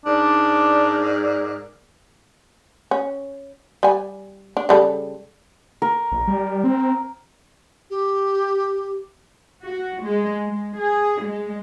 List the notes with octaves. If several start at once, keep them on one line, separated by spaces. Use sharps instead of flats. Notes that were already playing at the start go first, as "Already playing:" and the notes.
G#2 D4 A#4 D5
C#4
G3 G#5
D4
C#3 G3 A4
A#4
A#1
G3
C4
G4
F#4
G#3
G#3
G#4
G#3